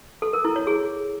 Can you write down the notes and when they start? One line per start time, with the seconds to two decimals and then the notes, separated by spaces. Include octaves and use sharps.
0.22 A4
0.33 A#4
0.45 E4
0.56 C#5
0.67 G#4